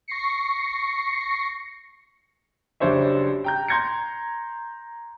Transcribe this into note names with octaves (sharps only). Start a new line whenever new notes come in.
C#6 A#6 C7 C#7
F#1 G3 D4 C5 C#5 E5
G5 A#5 G6
A#5 C6 G6 G#6 A#6 C#7